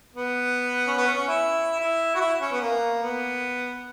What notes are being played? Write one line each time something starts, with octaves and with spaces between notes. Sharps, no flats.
B3
C#4
B3
C#4
C#4
E4
E4
F#4
E4
C#4
B3
A#3
B3